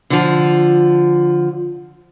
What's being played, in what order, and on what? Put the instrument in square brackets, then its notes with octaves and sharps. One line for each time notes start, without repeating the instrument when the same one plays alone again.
[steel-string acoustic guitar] D3 F3